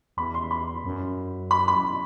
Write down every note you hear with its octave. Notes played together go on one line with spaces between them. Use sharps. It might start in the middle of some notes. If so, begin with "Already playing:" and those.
E2 B5
C6
B5
F#2
B5
B5